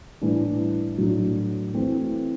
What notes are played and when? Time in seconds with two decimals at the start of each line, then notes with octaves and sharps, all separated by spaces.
0.21 A2 E3 G3 D4
0.98 A2 F#3 A3 D4
1.74 E3 A3 C4